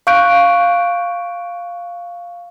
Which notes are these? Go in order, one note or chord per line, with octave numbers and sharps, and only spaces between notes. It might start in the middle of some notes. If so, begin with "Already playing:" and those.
F5 C#6 F#6 G6 D7